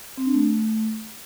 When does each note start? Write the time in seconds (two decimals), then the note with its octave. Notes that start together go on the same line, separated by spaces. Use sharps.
0.17 C4
0.26 D4
0.34 A3